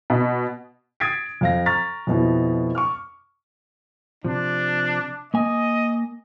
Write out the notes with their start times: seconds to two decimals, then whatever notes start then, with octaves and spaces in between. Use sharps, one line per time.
0.10 B2
1.00 D#6 G#6 A6 B6 C7 D7
1.41 F2 F5 A#6
1.66 A#5 C#6 F6 A6 B6
2.07 F2 B2 E4
2.75 C#6 D6 F6
4.25 C3 F3 D4
5.34 A#3 D#5 G#5